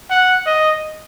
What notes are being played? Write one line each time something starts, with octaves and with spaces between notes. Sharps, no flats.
F#5
D#5